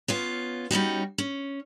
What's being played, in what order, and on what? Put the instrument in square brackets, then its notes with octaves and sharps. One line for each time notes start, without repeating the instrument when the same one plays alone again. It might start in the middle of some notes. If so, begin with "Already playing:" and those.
[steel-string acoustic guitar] B3 C#4 F4
G3 C#4 D#4 F#4
C#4